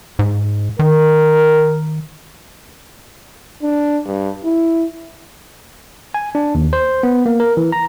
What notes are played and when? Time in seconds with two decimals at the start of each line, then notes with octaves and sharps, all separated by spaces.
0.19 G#2
0.79 D#3 A#4
3.62 D4
4.06 G2
4.44 E4
6.14 G#5
6.35 D4
6.55 D#2
6.73 C5
7.03 B3
7.26 A#3
7.40 A#4
7.57 E3
7.72 A#5